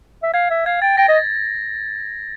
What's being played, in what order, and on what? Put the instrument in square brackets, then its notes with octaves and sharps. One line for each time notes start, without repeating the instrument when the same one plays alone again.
[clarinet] E5
[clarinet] F5 [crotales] G#6
[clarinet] E5
[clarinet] F5 [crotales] G#6
[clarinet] G5 [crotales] A6
[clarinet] G5 [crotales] A#6
[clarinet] D#5